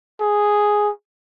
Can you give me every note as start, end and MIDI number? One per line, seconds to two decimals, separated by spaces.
0.20 0.90 68